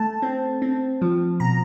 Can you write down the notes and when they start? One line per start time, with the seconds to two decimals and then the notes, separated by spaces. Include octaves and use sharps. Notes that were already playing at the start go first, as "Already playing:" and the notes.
Already playing: A3 A5
0.22 C4
0.62 C4
1.02 F3
1.40 B2 A#5